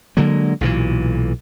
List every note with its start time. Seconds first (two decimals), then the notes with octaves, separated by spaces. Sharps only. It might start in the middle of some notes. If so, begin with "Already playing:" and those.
0.17 D3 F#3 G#3 A#3
0.61 B1 A#2 C#3 E3